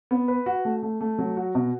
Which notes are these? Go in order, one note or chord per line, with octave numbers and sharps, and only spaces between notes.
B3
B4
F#4
A3
A3
A3
F#3
F#4
B2